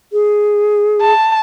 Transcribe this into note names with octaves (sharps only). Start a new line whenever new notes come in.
G#4
A5